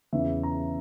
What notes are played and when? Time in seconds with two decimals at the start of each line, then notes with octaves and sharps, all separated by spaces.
0.13 E2 C#3 E3 E5
0.43 A#5